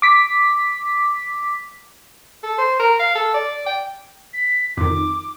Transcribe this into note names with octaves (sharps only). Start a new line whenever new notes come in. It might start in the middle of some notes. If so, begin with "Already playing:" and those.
D6 B6
A4
C5
A#4
F5
A4
D5
G5
B6
F2 D#3 D6